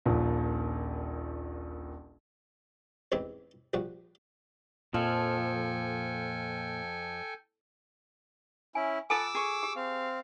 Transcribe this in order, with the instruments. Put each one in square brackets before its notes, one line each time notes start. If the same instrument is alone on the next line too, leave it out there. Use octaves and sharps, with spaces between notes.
[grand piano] D#1 A#1 D#2 A#2
[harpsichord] A1 E2 G#2 G#3 C4 B5
A#1 F3 G3 F#4
[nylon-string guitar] F2 [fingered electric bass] A#2 [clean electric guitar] F3 [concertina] A4 G5 G#5
[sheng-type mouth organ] C#4 E4 [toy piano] G#5
[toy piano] F4 A4 G#5 [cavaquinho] F#5 A5 [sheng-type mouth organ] D6 E6
[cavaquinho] G#4 C#6
[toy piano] G4
[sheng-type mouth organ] C4 F5